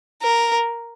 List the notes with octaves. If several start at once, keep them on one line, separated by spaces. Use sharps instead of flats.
A#4